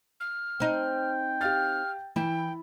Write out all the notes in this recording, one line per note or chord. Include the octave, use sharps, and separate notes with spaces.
F6
C4 D#4 G5
G4 F5 F6 A6
E3 E4 G5